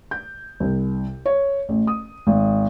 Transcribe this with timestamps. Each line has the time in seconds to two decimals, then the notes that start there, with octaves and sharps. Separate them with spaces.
0.11 G6
0.60 C2
1.26 C#5
1.69 A1
1.87 D#6
2.27 G#1